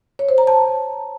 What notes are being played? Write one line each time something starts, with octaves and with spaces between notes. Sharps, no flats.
C#5
C5
A#5
A5